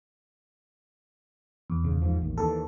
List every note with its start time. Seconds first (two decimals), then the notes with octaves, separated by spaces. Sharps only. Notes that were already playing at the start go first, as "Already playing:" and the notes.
1.70 E2
1.84 D#1 C#3
2.02 G#2 F3
2.21 A1 D#2
2.38 D#2 E3 A4